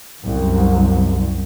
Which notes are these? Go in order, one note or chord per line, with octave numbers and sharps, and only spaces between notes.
C2 F#2